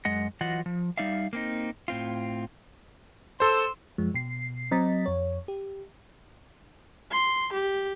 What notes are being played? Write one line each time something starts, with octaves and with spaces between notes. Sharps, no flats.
F#2 G#3 D#5 F#5
E3 F#3 F4 D#5 F#5
F3
G3 D#4 D5 E5 F5
A#3 C4 D#4
A2 C4 F4
A4 C5 C6 E6
F#2 F3 G#3
B2 C7
F#3 C4 D#5 A#5 A6 B6
F2 C#5
G4
C6
G4